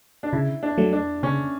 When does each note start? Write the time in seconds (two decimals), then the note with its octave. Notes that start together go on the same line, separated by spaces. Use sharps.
0.23 D4
0.33 C#3 E4
0.63 D4
0.78 F#3 A3
0.93 D4
1.23 C#3 C#4